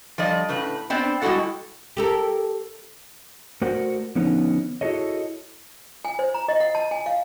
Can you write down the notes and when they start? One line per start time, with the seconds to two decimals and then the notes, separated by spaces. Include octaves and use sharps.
0.18 F3 G3 D5 D#5
0.48 A2 C#3 B4
0.90 B3 C4 C5 D5
1.22 G3 G#3 E4 F#4 A4 F#5
1.97 G4 A4 A#4
3.61 A3 F#4 A#4 C5 D5 F#5
4.15 D3 F3 B3 C#4 D#4
4.81 E4 F#4 G#4 A4 C#5 D#5
6.05 G#5
6.19 C5
6.34 A#5
6.48 D#5
6.60 F#5
6.75 A5
6.91 G#5
7.06 F5